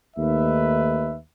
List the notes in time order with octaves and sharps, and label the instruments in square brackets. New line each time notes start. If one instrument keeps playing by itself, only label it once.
[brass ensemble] D#2 A3 D#4 B4 E5